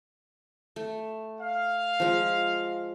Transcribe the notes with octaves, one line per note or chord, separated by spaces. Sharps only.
A3
F5
F3 G#3